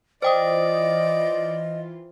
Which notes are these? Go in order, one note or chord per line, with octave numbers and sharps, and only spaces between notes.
E3 F4 C5 D5 D#5 G5 D#6